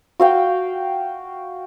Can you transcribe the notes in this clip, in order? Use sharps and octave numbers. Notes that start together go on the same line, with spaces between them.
F#4 F5 G5